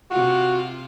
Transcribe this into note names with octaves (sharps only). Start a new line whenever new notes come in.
C3 F4 F#4